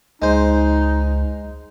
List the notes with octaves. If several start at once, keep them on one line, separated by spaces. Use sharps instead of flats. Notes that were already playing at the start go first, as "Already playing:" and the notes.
C#2 G#3 D#4 C5